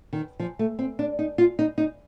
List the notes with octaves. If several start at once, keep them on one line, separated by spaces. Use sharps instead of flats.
D#3
F3
A3
C4
D4
D#4
F4
D#4
D#4